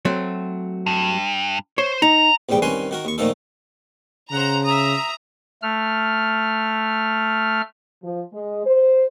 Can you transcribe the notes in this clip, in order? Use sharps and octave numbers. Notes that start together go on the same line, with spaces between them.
F#3 A3 C4
G2
C5 C#5
D#4 A#5
A#1 E2 G#2 G3 G5
C2 D#3 C#4 B4 G#5 C6
D#3 F#4 A#4
D#2 C#6
A#2 D#3 F3 A3 D#4 A4
C#3 C5 F#5 A#5
E5 A#5 D#6
A3 F6
F3
G#3
C5